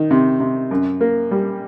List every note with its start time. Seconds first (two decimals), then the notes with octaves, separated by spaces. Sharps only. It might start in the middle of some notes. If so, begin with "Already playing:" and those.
Already playing: D#3
0.11 C3
0.40 C3
0.71 F#2
1.01 A#3
1.31 G3